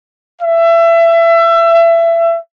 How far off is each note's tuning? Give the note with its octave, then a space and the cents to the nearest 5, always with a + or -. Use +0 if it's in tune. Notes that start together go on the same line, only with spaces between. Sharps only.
E5 +25